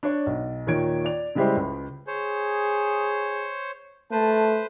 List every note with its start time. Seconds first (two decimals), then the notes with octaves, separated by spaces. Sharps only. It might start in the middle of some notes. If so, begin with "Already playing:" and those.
0.03 D4 C#5 D5
0.26 B1
0.67 D#2 A#2 D#3 C#5 G#6 D7
1.05 D5 F7
1.35 C#3 G3 G#3 E4 G4 C5
1.56 C#2
2.07 G#4 C5 C#5
4.11 A3 B4 C5 A5